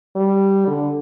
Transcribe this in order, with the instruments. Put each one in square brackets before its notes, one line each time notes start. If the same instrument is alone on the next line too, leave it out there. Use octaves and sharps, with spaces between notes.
[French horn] G3
D3